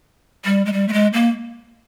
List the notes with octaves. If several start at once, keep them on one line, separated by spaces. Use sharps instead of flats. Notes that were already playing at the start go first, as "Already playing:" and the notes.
G3
G#3
G3
A3
G#3
A#3